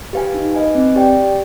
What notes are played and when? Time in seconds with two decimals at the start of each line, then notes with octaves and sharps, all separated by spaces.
0.13 G4 B4 F5 G#5
0.34 D#4
0.54 B4 D#5 G#5
0.75 C4
0.96 G4 D5 G5
1.17 G4